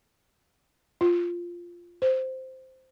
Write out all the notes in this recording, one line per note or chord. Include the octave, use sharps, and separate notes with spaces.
F4
C5